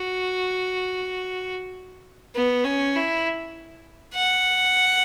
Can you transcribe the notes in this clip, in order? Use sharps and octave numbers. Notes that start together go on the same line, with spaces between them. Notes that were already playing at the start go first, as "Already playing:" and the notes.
Already playing: F#4
B3
C#4
E4
F#5